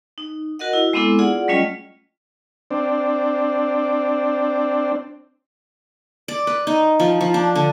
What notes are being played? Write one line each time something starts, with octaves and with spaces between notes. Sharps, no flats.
D#4
F#4 A#4 D#5 F#5
E4
G#3 B3 C4 D4 E4 A4
F4 G#4 D5 F#5
F#3 G3 A3 C#4 F4 D#5
C4 D4
D5
B4
D#4
F3
F3
D4
D3